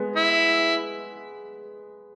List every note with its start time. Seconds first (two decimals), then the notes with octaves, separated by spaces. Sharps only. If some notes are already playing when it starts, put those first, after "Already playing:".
Already playing: G#3 B3
0.16 E4